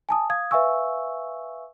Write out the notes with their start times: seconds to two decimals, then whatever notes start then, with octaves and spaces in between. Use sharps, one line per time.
0.09 G#5 A5 D#6
0.30 F5 D#6 G#6
0.51 B4 E5 F5 G#5 C#6 E6